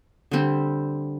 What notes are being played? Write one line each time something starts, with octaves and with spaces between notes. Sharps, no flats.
D3 G3 C4